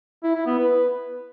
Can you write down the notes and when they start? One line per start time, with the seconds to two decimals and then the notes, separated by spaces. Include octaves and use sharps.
0.23 E4
0.35 E4
0.46 B3
0.58 B4